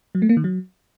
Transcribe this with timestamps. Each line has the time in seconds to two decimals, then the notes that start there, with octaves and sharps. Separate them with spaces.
0.15 F#3
0.22 A3
0.29 A#3
0.37 D#3
0.44 F#3